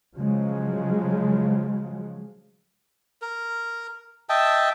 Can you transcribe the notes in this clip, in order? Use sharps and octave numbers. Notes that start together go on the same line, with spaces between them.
C#3 F3 F#3 G#3
A#4
D#5 E5 G5 A5